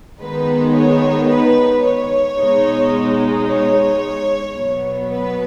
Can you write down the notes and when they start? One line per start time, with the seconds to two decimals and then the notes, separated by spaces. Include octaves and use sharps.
0.20 D#3 G#3 B3 D#4 B4
0.75 C#5
1.29 B4
1.83 C#5
2.38 B2 G#3 D#4
3.47 C#5
4.55 B2 F#3 B3
5.10 B4